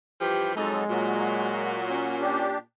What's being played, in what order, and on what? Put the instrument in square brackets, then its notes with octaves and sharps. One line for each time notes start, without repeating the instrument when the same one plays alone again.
[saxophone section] G2 E3 F3 [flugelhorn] G4
[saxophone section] F2 D#4 [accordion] F#3 A4 [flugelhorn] G#3
[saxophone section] A#2 [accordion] F#3 F#4
[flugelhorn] C#4
[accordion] D4 G4